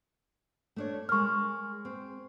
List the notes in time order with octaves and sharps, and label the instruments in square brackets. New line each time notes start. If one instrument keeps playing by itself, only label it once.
[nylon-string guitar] A3 D4 C#5
[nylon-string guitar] G#3 A#4 [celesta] C#6 F6
[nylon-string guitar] C4